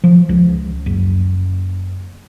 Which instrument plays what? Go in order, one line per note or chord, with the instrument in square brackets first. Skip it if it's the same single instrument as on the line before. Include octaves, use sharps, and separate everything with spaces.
[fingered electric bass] F3
C#2
F#1